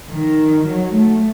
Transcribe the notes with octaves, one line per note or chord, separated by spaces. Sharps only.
D#3
F#3
A3